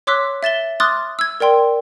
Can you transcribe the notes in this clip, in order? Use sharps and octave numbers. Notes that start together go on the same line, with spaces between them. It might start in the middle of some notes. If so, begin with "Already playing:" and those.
C#5 C6 D6 E6 F#6 B6
E5 A6 E7 G7
C6 D6 D#6 F6 F#6 A6
E6 G#6
A#4 D5 G5 C6